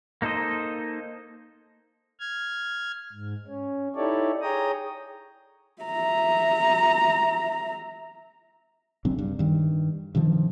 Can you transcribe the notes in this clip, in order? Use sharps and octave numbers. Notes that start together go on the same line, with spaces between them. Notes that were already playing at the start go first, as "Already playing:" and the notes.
A#3 D#4 A4 C5 D#5
F6 G#6
G#2
C#4
D#4 E4 G4 A4 C#5 D5
G#4 C#5 G5 A#5 D#6
E5 A#5
C#3 F#3 C4 D4
G2
G2 D#3
G2 C3 D#3 F3